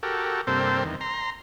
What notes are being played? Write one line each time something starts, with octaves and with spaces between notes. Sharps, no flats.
F#4 G4 A4 A#4
G2 C3 A#3 C4 A4 C5
E2 D#3
A#5 C6